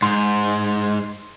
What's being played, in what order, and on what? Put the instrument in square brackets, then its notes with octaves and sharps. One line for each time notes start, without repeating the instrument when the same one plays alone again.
[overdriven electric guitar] G#2 [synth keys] C6